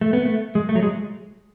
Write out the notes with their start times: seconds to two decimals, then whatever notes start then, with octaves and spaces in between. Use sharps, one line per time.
0.01 A3
0.13 B3
0.25 A3
0.55 G#3
0.69 A3
0.75 F#3
0.83 G#3